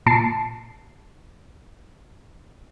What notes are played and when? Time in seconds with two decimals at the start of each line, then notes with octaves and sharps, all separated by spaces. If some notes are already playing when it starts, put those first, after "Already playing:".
0.06 A#2 A5 C7